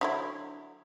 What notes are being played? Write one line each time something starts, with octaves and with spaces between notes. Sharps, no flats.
D3 F#3 E4